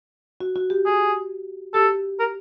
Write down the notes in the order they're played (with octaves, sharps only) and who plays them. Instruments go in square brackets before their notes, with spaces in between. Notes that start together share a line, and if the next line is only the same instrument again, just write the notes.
[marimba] F#4
F#4
G4
[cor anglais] G#4
[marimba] G4 [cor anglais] A4
[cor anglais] A#4